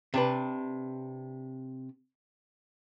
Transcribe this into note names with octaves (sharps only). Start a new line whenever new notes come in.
C3 D4 B4